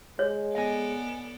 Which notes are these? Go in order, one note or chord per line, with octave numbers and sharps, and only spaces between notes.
G#3 C#5
B3 A4 D5 D#5 G#5